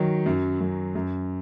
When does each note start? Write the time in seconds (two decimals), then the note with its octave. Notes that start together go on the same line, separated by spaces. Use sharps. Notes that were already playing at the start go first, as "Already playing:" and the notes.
Already playing: D#3 F#3
0.26 F#2
0.60 F#2
0.95 F#2